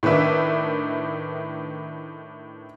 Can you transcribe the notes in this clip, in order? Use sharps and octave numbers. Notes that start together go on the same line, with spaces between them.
A2 D#3 D4 B4 E5